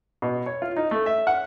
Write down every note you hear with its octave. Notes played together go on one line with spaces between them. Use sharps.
B2
C#5
F4
D#4
A3
E5
F#5